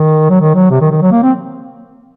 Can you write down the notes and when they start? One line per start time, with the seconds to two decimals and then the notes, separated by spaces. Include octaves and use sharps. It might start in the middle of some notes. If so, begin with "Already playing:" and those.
Already playing: D#3
0.30 F#3
0.41 D#3
0.55 F#3
0.71 C3
0.81 D#3
0.91 D#3
1.02 F#3
1.11 A#3
1.23 C4